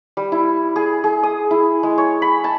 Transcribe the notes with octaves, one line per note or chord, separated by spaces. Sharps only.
G3
E4
G#4
G#4
D#6
E4
G#3
C#5
B5
A5